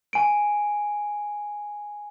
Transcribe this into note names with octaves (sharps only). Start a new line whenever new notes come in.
G#5 D7